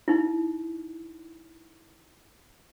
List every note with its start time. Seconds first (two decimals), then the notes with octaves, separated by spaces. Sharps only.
0.08 D#4 E4